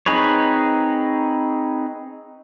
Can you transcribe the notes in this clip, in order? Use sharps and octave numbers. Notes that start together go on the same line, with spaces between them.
C4 D#4 G#4 B4 C#5